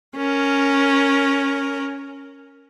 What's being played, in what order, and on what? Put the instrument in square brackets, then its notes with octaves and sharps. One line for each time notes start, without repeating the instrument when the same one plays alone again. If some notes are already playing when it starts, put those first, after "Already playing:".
[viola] C#4 A#4